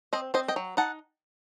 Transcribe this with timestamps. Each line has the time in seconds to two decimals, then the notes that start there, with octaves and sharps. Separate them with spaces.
0.13 C4 C5 D#5
0.34 C4 C5 D#5
0.48 D#5 G5
0.56 F#3
0.77 D#4 F#5 A5